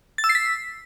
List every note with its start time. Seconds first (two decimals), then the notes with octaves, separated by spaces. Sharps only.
0.18 A6
0.24 E6
0.29 C7
0.35 B6